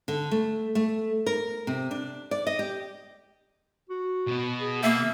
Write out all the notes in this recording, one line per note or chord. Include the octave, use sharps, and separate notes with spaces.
D3
A3
A3
A#4
C3
D4
D5
D#5
G4
F#4
B2 B3
G#4
A#3 E5